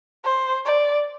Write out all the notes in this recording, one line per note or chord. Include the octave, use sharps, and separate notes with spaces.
C5
D5